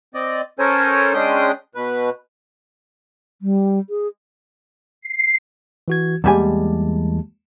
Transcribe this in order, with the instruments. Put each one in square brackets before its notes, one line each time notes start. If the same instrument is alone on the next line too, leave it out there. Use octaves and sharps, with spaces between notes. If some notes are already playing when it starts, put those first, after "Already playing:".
[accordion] C4 D5 D#5
C#4 A4 A#4 C5 C#5 G#5
G#3 C#4 D4 G5 C6 D#6
B2 B4
[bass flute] G3
G#4
[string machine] C7
[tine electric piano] E3 F#4 G#6
[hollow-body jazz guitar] E2 G3 G#5 [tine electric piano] G#3 A#3 A5